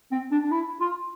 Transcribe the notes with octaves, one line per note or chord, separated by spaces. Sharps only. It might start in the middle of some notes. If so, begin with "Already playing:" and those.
C4
D4
D4
E4
F4